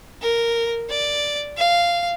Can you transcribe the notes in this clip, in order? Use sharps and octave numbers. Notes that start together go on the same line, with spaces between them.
A#4
D5
F5